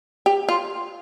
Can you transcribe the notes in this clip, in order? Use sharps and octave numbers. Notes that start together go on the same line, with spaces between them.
G4
F4